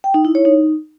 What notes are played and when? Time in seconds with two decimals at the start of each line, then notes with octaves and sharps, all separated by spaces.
0.04 G5
0.14 D#4
0.25 E4
0.35 C#5
0.45 D#4